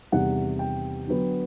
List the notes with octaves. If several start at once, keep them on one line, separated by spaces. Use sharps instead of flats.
E2 C3 D#3 G3 F#5
G5
D3 F#3 B3